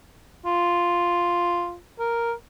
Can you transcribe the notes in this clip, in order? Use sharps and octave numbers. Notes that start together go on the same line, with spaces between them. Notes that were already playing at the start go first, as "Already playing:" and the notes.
F4
A#4